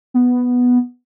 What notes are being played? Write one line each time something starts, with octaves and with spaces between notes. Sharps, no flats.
B3